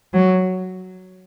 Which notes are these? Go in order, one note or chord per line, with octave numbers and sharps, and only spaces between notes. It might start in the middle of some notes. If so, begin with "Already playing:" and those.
F#3